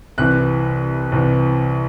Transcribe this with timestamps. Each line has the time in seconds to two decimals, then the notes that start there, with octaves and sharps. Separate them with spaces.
0.18 C2 C3 E3 F#6
1.12 C2 C3 E3